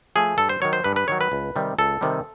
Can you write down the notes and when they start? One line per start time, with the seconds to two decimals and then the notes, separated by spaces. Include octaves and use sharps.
0.15 F3 A3 G#4
0.38 G2 A4
0.49 C5
0.62 D#3 F#3 C#5
0.73 C5
0.84 G2 B4
0.96 B4
1.08 D#3 F#3 C#5
1.21 B4
1.32 C#2
1.56 C3 D#3 G3
1.78 C#2 A4
2.01 C3 D#3 G3